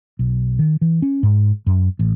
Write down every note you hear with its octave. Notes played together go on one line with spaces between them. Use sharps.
B1
D#3
E3
C#4
G#2
F#2
A1